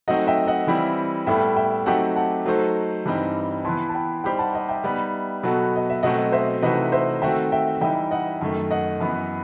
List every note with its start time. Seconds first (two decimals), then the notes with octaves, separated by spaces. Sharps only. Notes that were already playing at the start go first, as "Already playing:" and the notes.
0.08 F#3 A3 C4 D#4 D#5 F#5
0.27 E5 G5
0.47 D#5 F#5
0.67 E3 G3 C4 E4
1.26 A2 G3 B3 E4 A4 E5 G5
1.56 E5 G5
1.86 F#3 A3 C4 D#4 G4 F#5 A5
2.16 F#5 A5
2.46 F#3 A3 D#4 A4 C5
3.06 G2 E3 G3 C4 D#4
3.65 E3 B3 E4 A5 C6
3.89 A5
3.95 G5 B5
4.24 G3 D#4 G4 C5 G5 B5
4.39 F#5 A5
4.54 D#5 F#5
4.69 E5 G5
4.84 G3 B3 D#4
5.43 B2 F#3 B3 F#4 A4
5.76 D#5
5.90 E5
6.03 B2 F#3 A3 C4 D#5 F#5
6.32 C5 E5
6.62 C3 E3 A3 D#4 F#4 B4 D#5
6.92 C5 E5
7.22 D#3 A3 C4 F#4 E5 G5
7.52 E5 G5
7.81 E3 G3 D#4 E5 G5
8.11 D#5 F#5
8.41 F#2 D#3 A3
8.71 D#5 F#5
9.00 F#2 E3 B3